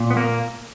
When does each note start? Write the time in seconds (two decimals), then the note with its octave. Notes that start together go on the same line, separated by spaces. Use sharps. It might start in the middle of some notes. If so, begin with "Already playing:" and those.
Already playing: A#2
0.10 B3
0.17 A#3